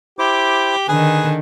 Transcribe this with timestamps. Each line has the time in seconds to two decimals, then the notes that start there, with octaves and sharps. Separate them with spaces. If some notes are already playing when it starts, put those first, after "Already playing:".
0.19 E4 G4 C5 D6
0.88 D3 D#3 G#4 B4